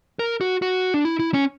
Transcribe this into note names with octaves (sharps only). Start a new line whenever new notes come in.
A#4
F#4
F#4
D4
E4
E4
C#4